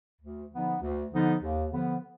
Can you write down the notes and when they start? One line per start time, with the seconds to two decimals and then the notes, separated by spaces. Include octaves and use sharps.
0.22 D2
0.53 D3 F3 B3 D#4
0.81 D2
1.12 D3 F3 B3 D#4
1.42 D#2
1.72 D3 F3 B3